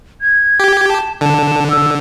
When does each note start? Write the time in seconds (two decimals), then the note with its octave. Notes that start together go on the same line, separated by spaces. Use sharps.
0.21 G#6
0.60 G4
0.89 A5
1.21 D3 A5
1.71 E6